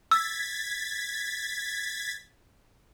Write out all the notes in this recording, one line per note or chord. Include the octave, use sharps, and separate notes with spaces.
E6 G#6 A6 B6